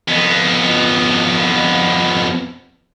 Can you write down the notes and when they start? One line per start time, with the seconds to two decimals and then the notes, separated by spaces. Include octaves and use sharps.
0.08 F2 B3